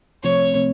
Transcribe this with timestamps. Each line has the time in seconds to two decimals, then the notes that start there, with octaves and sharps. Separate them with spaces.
0.23 C2 C3 F3 A3 C4 C#5
0.54 C3 F3 A3 C4